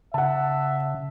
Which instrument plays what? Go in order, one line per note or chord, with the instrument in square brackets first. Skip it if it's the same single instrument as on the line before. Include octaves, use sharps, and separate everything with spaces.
[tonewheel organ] C#3 [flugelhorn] E5 [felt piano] F#5 A5